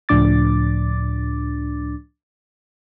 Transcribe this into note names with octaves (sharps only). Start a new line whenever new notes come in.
C#2 A2 F3 D4 D6 A6